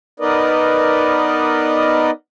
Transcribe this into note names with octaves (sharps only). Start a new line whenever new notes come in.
B3 D#4 A#4 B4 D5 D#5